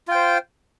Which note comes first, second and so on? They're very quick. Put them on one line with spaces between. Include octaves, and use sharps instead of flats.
F4 G5 C5